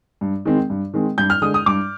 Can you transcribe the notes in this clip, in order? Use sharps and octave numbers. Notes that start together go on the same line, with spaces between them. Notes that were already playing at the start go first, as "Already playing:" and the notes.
G2
D#3 G#3 C4
G2
D#3 G#3 C4
G2 G6
F6
D3 G#3 D#6
D#6
G2 D6